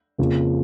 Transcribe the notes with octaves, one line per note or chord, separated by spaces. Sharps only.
F2 C#3 F3 A#3